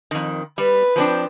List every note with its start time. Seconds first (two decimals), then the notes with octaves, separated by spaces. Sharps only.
0.11 F2 D#3
0.58 G3 B4
0.96 F3 C4 D4